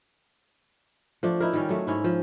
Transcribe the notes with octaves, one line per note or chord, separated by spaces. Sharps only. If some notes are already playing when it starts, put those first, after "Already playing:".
F3 A3 D4
D#4 E4 A#4
D#3 G3 C#4
F#3 A3
G#2 C#4 E4
F3